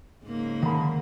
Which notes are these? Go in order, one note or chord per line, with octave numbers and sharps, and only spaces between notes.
G#2 C#3 A#3
D3 D#3 B5